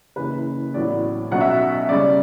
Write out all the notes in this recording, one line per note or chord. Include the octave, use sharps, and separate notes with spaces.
F#1 F#2 E3 B4
A1 A2 F#3 B3 D5
B1 B2 F#3 C#4 F#5
E5
F#5
F#2 C#3 G3 D5